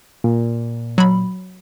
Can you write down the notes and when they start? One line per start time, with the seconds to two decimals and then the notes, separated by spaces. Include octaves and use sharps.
0.24 A#2
0.98 F#3 B5